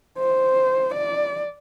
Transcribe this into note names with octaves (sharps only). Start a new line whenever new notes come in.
C5
D5